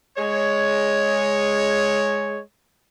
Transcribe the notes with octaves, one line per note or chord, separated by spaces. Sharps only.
G#3 C#5